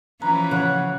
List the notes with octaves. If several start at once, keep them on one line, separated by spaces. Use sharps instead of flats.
E3 F3 C#4 B4 A#5
C#3 F#5